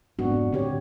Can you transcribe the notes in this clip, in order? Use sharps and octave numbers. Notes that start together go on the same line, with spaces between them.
F1 G#2 B3 C4 D4 F#4
A2 D3 C4 G4 C#5